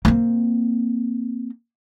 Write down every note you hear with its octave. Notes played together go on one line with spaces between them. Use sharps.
A#3 C4